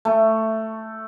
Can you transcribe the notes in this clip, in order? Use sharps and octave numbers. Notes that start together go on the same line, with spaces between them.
A3